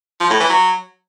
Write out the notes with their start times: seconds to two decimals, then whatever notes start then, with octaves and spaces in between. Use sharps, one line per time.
0.20 F3
0.30 A2
0.40 E3
0.50 F#3